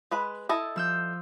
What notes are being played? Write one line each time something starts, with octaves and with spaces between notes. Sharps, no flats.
G#3 B4 B5
E4 A4 D#5
F3 E6 G6